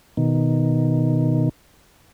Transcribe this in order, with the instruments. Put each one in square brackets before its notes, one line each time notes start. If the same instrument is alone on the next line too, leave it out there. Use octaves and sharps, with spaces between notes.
[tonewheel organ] B2 D#3